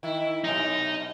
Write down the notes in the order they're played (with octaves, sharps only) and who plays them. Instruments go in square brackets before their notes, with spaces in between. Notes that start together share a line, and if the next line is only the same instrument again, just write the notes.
[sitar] D#3 E4
[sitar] F#2 B2 [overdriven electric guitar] D#4